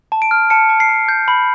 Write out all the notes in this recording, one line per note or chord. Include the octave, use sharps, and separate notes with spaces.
A5
D7
F6
A5 C#7
A5
C7
A5
G6
B5